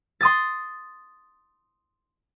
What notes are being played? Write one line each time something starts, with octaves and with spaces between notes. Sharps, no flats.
C6 D#6 A6